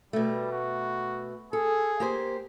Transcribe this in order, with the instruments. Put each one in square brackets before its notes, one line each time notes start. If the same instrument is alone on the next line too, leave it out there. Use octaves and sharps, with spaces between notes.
[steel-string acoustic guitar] B2 A3 [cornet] G3
[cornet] F#4
[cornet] G#4 [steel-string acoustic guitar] A4
[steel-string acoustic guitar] A#3 G4 C5